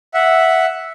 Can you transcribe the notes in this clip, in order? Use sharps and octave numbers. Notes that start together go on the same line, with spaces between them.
E5 F#5